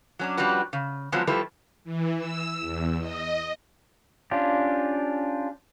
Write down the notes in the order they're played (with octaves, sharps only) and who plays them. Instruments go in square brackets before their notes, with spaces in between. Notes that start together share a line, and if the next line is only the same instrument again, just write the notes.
[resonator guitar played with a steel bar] F#3 C#4 D4
F3 G3 C#4 D4 F#4 B4
C#3
F3 F#3 G#3 B3 C4
F3 G3 A3 E4 B4
[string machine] E3
E6
E2
D#5
[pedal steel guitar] C#4 D4 F4 G4